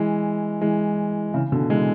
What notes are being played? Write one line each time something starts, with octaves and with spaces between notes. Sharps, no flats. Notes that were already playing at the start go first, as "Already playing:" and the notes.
Already playing: E3 G#3
E3 G#3
C#3 E3
B2 D3
E3 G#3